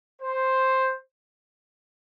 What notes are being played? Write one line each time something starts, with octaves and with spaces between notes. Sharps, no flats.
C5